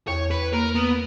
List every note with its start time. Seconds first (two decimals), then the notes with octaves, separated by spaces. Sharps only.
0.08 E2 C#5
0.31 B4
0.53 A#3 A#4
0.75 B3